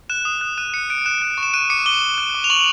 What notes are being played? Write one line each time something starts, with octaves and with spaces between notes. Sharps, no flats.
F#6 E7
D#6
F#6
F#6 D#7
F#6 C#7
F#6 D7
F#6 E7
F#6
C#6
E7
F#6 D#7
D6 C#7
D6 G7
D6
F#6
D6
F7
C#6 F#7